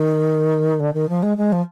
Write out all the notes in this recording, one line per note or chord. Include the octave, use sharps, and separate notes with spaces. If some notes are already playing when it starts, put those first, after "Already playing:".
Already playing: D#3
D3
D#3
F3
G#3
G#3
F3